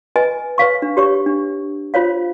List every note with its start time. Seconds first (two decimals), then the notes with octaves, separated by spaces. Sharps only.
0.16 B4 D#5 G#5
0.58 B4 C#5 F5 C#6
0.82 D4
0.97 G4 C#5 C#6
1.26 D4
1.94 F4 C5 C#5 F5